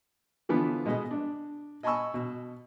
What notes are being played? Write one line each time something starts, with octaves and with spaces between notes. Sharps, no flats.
D3 E3 F3 B3 D4
B2 G#3 B3 D#5
D4
D#5 G#5 A5 B5 C#6 E6
B2